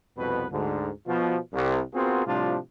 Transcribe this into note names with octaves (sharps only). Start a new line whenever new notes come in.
C2 F2 B2 B3 B4
D2 G#2 D3
B2 F3
C2
B3 C4 F4 F#4 G#4 A#4
A2 C3 F3 G3 D4 F4